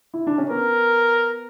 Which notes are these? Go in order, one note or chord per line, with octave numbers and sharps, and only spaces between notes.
E4
D4
C#4
B3 A#4